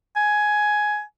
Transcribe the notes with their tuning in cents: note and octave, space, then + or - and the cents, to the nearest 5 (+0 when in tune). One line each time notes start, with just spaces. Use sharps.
G#5 +10